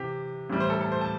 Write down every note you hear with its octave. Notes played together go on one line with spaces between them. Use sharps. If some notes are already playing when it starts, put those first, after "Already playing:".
Already playing: C3 E3 G4
A2 E3 G3
C5
A4
A4
C5
A5